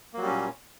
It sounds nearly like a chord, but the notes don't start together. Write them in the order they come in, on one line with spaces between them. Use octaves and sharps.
A#3 F#3 G3 C#4 A#2